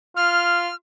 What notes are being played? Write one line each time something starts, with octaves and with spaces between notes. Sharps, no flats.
F4 F6